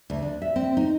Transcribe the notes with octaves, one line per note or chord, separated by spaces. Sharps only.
D2
D4
E5
C4
D#4